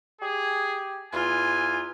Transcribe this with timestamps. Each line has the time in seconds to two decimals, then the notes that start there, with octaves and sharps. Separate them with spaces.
0.22 G4 G#4
1.13 E2 F4 G#5